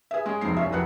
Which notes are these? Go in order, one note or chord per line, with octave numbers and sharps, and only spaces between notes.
G#4 B4 E5
G#3 C#4 G#4
F1 B1 F2 G#3 D#4 C7
C2 C#4 F4 E5
F1 E4 F#4 B4 F#6 C#7